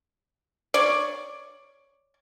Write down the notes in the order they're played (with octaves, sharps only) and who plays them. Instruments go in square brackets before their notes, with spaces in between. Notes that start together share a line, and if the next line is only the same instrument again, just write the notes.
[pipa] C#5 D5